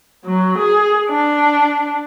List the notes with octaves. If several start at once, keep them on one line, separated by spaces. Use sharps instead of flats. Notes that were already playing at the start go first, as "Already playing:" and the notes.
F#3
G#4
D4